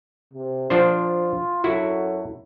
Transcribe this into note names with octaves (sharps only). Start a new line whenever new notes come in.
C3
F3 D4 F4 C5
F#2 F#3 E4 F#4 A4